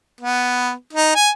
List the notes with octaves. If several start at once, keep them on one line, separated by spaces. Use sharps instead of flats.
B3
D#4
G#5